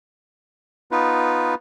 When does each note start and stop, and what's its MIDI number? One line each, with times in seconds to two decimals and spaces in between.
0.91 1.55 59
0.91 1.55 63
0.91 1.55 65
0.91 1.55 71